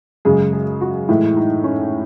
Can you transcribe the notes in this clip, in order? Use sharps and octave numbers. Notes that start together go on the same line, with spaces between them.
F#2 C#3 G#3 G#4
G#4
F#4
A2 E3 G#3 E4
D#4
C#4